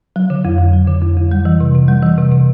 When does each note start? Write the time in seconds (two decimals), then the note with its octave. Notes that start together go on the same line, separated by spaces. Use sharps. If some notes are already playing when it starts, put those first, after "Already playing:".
0.16 F#3
0.30 D3
0.45 F2
0.59 F2
0.73 F#3
0.88 D3
1.02 F2
1.17 F2
1.31 G3
1.45 E3
1.61 C3
1.75 C3
1.88 G3
2.03 E3
2.18 C3
2.32 C3